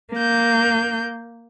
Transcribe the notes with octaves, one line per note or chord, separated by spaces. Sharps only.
A#3 G6